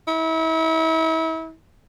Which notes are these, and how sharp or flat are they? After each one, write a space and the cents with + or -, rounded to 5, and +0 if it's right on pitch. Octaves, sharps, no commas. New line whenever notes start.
E4 -35